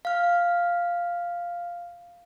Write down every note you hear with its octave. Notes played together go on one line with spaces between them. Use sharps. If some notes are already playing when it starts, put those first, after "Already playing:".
F5 F6